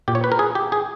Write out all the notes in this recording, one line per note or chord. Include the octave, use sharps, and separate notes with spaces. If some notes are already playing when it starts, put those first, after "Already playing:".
A#2 G4
C#5
B4
A#4
G#4
G4
G#4